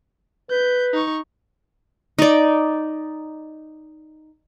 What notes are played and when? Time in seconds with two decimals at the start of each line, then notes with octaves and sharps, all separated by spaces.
0.51 B4 G6
0.93 D#4 C#6
2.19 D#4 D5